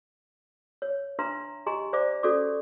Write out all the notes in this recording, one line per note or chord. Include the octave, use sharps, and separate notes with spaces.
C#5
D4 B4 E5 A#5 C6
G4 D#5 G#5 A#5 C6
C5 D5 E5 D6
C#4 F#4 A4 D5 C#6 D6